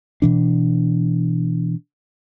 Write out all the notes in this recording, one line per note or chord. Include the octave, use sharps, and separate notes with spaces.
B2 E3 D4